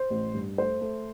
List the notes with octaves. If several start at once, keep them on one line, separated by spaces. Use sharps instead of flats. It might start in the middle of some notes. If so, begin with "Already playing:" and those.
Already playing: C5
A1
G2
A3 C5
A3